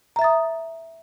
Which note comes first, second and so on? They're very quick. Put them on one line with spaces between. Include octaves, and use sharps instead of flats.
A#5 E5 A6 D#6